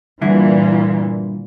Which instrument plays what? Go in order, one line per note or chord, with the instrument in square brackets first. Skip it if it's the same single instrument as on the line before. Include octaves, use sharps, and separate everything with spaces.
[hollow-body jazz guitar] G2 D3 E4 [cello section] A#2 E3